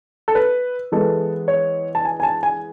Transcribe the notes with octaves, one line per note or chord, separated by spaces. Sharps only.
A4
B4
E3 G#3 B3 A4
C#5
A5
G#5
G#5
A5
G#5